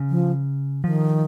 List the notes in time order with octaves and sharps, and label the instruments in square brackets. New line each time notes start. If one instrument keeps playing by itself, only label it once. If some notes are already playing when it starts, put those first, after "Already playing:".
Already playing: [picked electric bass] C#3
[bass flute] F3
[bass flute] D#3 [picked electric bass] F3